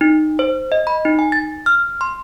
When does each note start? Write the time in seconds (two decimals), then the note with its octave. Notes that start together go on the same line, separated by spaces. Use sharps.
0.01 D#4
0.39 C5
0.72 D#5
0.87 B5
1.05 D#4
1.19 G#5
1.32 A6
1.66 F6
2.01 C6